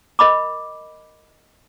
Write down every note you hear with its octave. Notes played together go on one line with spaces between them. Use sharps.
A#4 D#5 B5 D6